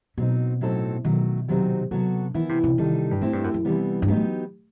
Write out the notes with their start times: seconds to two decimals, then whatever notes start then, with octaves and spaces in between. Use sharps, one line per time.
0.17 B2 F#3 C4 D#4
0.61 A2 F#3 C4 D#4 A4
1.04 B2 D#3 F#3 A3
1.48 C3 D#3 F#3 C4 D#4
1.91 C3 F#3 B3 F#4 A4
2.34 D#3 E3 B3 E4
2.49 C3
2.64 C3
2.78 C3 D#3 G3 D#4 A4
3.11 G2
3.21 A2 A3 C4 E4 G4
3.33 G2
3.44 F#2
3.54 F#2
3.65 C3 E3 G3 B3
4.02 G2
4.08 A2 F#3 B3 D#4 G4